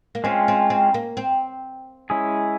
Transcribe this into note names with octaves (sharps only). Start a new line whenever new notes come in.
A#3
G#3 C4 C#4 F4
C4
C4
A#3
C4
G#3 C#4 E4 G#4